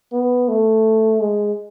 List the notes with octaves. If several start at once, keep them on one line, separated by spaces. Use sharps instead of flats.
B3
A3
G#3